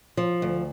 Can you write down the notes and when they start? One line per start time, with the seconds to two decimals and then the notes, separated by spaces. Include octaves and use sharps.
0.17 F3
0.42 D2